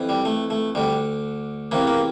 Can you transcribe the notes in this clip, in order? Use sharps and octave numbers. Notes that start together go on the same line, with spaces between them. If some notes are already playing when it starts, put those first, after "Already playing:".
Already playing: F2 E3
G3
A3
A3
D2 D3 G3
E2 C3 E3 A#3
A#3